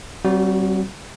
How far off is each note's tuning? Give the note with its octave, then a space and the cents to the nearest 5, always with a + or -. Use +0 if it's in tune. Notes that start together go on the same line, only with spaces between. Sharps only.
G3 -40 C4 +25 F#4 +0